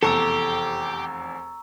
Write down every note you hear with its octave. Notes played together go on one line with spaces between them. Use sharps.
F1 E2 G4 A4 A#5 C#6 E6